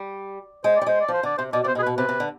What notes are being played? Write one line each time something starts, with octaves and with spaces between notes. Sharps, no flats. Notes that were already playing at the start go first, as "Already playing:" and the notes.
Already playing: G3
G#3 C5
D5
G3
G#3 C5
D5
F3 C5
D3 D5
C3 C5
B2 D5
C3 D5
C5
B2
G#4
B4
B2
C3 B4
C3
D3